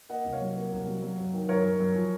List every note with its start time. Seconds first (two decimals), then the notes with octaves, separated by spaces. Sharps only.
0.09 A#3 D#5 F#5
0.25 C2
0.32 C#5 F5
0.40 F#3
0.56 A#3
0.71 C2
0.87 F#3
1.02 F#3
1.18 F#2
1.33 D#3
1.49 F#2 A#4 C#5
1.64 F#2
1.80 F#2
1.95 F3